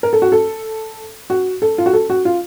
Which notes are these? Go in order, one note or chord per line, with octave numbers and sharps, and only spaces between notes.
A#4
A4
F#4
A4
F#4
A4
F4
F#4
A4
F#4
F4